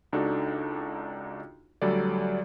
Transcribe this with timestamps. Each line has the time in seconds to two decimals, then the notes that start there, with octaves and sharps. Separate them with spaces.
0.13 C#2 D4 D#4 F#4 A4
1.82 D2 F#3 G3 A4 D5